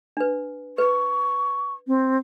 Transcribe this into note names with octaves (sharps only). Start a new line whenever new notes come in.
D4 B4
B4 C#6
C4